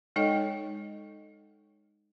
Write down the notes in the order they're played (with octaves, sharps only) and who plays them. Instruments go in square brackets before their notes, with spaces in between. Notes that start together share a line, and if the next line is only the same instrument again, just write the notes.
[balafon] G#3 D#4 A4 C#5 D#5 G5